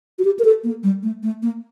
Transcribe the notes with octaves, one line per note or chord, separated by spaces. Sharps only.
F#4
G4
A#4
A4
A#3
G3
A3
A3
A#3